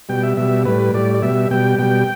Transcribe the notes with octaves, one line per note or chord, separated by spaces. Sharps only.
B2 G3 G5
E5
B2 G3 E5
A2 G3 B4
A2 G3 D5
D5
B2 G3 E5
B2 G3 G5
B2 G3 G5